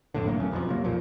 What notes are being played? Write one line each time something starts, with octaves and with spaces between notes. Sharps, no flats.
F2 A2 D3
B1 F#3 A3 A#3
F1 E2 C#4
E1 B1 F2 F3
C3 F#3 A#3
B1 F2 A#2 F3